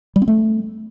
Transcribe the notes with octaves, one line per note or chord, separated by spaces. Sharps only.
G3
C4
A3